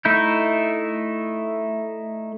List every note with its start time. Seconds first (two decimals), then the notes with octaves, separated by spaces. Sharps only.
0.05 A3 D#4 E4 G6